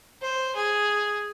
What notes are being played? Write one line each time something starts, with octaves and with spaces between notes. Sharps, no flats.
C5
G#4